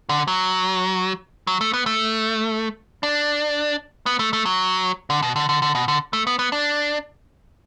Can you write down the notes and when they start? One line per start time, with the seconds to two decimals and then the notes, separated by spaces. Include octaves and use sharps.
0.09 D3
0.28 F#3
1.47 F#3
1.61 A3
1.73 B3
1.86 A3
3.03 D4
4.06 B3
4.19 A3
4.33 A3
4.45 F#3
5.10 D3
5.23 B2
5.36 D3
5.49 D3
5.62 D3
5.75 B2
5.88 D3
6.13 A3
6.27 B3
6.39 B3
6.52 D4